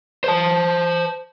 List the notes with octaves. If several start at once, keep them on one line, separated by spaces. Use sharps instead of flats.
C5 A5